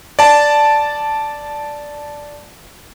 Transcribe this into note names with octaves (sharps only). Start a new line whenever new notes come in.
D5 A5